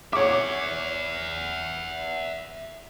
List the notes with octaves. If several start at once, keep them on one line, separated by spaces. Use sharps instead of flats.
C#5 E5 F#5 D6